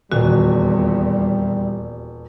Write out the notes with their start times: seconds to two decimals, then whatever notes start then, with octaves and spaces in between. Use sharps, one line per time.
0.12 D#1 E2 A#2 G3 F#4